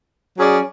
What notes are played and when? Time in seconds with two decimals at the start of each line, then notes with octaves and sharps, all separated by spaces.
0.37 F#3 C#4 G#4 D5